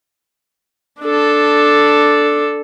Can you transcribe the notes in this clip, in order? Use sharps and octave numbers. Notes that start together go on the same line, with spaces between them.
D4 A4